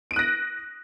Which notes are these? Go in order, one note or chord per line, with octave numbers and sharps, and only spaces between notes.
F#6 A#6 D7 D#7